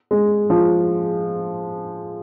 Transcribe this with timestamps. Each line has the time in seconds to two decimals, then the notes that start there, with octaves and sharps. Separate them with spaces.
0.11 G#3
0.50 F3